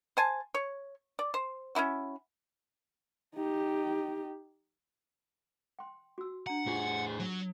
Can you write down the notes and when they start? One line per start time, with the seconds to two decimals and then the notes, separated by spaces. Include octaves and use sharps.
0.17 C5 G#5 A5
0.54 C#5
1.19 D5
1.34 C5
1.75 C#4 D#4 E4 F#4
3.34 D#4 G4
5.79 G5 C6
6.18 F#4 E6
6.47 D4 F#5 A#5
6.66 A2 F4 G4 G#4 C#6
7.20 F#3